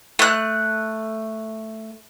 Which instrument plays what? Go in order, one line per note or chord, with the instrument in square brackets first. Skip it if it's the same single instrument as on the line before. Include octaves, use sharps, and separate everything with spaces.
[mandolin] A3 F#6